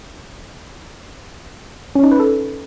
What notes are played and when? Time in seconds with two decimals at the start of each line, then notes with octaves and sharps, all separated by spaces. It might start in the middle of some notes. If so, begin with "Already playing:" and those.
1.95 C#4
2.03 D#4
2.12 B4
2.20 A4